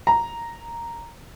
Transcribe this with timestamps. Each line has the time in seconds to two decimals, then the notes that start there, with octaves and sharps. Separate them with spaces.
0.07 A#5